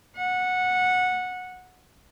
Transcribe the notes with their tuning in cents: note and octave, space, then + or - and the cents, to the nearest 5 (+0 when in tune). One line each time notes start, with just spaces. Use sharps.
F#5 -15